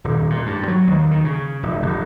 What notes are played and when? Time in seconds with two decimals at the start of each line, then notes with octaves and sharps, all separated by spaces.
0.04 D#1
0.30 A#2
0.46 G2
0.68 F#3
0.87 D#2
1.11 D#3
1.25 C#3
1.63 F1
1.82 F1